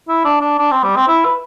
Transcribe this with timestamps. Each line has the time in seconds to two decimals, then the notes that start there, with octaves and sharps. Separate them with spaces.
0.08 E4
0.25 D4
0.41 D4
0.58 D4
0.71 C4
0.83 G3
0.96 C4
1.08 E4
1.25 B4